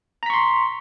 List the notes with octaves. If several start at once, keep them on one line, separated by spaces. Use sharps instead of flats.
A#5 C6 C#6 B6